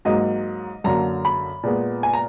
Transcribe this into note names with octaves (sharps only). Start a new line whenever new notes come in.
G#2 F#3 A#3 D#5
F#2 D3 F#3 A#3 A#5
B5
A#2 G#3 B3
G#5
A#5